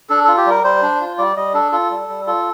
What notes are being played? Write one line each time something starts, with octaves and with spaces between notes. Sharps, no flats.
D4 A4
F4 A4
G4
G3 A#4
G3 C5
D4
F4
G3 D5
G3 D#5
D4 A4
F4 A4
G3
G3
F4 A4